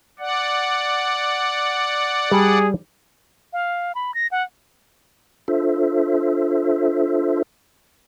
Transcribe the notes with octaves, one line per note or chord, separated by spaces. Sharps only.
D5 F#5
G3 G#4 A5
F5
B5
A#6
F#5
D4 F4 A4 C5 E5